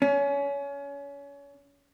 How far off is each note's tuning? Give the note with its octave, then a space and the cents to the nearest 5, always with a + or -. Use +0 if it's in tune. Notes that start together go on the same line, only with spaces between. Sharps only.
C#4 +30